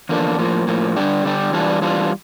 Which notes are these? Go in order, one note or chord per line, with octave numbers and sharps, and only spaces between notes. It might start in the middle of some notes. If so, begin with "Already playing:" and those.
E2 D3 F3 A#3 D4
A2 F3 A#3
A2 F3 A#3
D3 G3 D4 G4
D3 G3 D4 G4
E2 E3 G3 D4 F4
E2 E3 G3 D4 F4